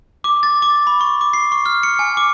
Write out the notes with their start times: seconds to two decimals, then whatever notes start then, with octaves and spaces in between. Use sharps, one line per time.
0.24 D6
0.43 A6
0.62 D6
0.87 B5
1.01 C#6
1.21 D6
1.33 C7
1.52 C#6
1.66 F6
1.83 C#7
1.99 G#5
2.17 D6